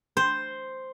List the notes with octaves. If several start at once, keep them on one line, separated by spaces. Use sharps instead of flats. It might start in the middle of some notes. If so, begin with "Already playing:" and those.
C5